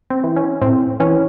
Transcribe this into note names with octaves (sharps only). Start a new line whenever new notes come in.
C4
E3
C#4
A2 C4
E3 C#4